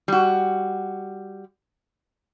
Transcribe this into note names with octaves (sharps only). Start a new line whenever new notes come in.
G3 F#4